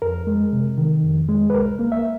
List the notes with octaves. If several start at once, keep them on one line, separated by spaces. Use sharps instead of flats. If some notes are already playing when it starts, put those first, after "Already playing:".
F2 A#4
G#3
C3
D#3
F2
G#3
B4
C2 A#4
A#3
E5